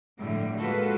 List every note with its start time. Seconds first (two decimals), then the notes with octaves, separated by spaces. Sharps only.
0.17 F2 A2 D3 G3
0.57 G#3 A#3 F4 F#4 A4 B4